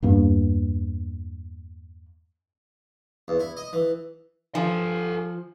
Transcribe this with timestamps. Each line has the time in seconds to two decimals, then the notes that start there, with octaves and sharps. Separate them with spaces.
0.02 E2 G2 A#3
3.28 E2
3.39 E4
3.57 D#5
3.73 E3
4.55 F3 A4 G#5